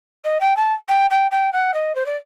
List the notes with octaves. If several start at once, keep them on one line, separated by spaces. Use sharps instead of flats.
D#5
G5
A5
G5
G5
G5
F#5
D#5
C5
D5